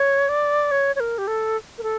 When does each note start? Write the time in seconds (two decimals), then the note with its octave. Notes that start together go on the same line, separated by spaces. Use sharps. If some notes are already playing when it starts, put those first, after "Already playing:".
Already playing: C#5
0.29 D5
0.71 C#5
0.96 C#5
1.00 A#4
1.18 G4
1.27 A4
1.78 A#4
1.83 A4